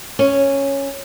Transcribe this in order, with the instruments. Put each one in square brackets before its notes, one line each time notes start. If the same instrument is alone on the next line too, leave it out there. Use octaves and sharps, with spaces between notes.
[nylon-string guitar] C#4